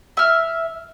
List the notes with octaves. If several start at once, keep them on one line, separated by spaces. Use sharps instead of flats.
E5 F6